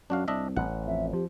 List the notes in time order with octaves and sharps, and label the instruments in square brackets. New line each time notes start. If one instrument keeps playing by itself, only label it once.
[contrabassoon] F#2 [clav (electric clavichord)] D4 F#4 F5
[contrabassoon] C2 [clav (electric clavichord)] D4 D#5 E5
[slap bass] A1 [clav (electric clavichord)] F#5
[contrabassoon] F2 [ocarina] E5
[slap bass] F3 [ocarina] G4